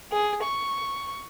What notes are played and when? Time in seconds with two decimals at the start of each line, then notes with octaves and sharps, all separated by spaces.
0.12 G#4
0.44 C#6